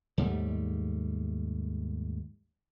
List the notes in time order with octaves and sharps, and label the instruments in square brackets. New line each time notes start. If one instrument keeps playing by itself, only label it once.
[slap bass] D#2 G#2 G3 A3